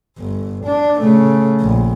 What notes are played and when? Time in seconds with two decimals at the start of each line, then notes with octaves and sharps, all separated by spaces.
0.19 G1
0.65 D4
1.00 C#3 A3
1.61 A#1